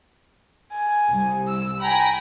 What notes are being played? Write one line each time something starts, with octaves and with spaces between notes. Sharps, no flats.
G#5
C2
E6
G5 G#5 A#5 B5